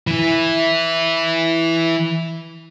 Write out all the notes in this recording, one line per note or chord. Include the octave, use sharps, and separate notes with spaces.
E3 E4